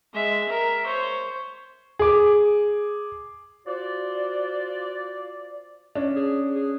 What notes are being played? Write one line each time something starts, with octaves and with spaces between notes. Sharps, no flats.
G#3 E5
A#4 E5
C5 C#5
G#4 D6
F4 F#4 C5 D5
C#4 D4
G#4
G#4